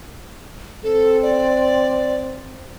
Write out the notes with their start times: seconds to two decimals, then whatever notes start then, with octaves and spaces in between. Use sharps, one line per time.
0.83 C4 A4
1.22 D5